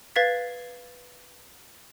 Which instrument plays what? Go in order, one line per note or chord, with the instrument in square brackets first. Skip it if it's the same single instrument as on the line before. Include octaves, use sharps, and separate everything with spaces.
[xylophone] B4 F5 G#6 A6 B6